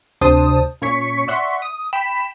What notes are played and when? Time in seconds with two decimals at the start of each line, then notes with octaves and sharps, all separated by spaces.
0.21 D2 C3 D4 C5 A5 D#6
0.82 A#2 C#4 C#5 C#6 B6 C#7
1.28 D5 E5 F#5 C6 C#6 B6
1.62 D#6
1.93 G5 B5 B6 E7